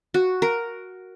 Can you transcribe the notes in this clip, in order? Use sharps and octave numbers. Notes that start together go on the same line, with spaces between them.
F#4
A#4